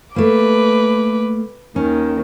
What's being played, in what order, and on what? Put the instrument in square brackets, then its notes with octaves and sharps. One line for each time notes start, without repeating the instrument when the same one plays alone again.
[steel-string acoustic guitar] A3 A#3 [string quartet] B4 D6
[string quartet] D#2 D#3 [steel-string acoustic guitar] C#4